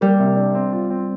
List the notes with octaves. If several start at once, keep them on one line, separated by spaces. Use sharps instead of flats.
G3 A#3
C3
D4
C4
F4
C4